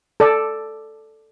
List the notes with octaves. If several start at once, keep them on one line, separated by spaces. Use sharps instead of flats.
A4 D5